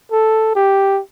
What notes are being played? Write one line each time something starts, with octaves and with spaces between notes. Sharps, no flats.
A4
G4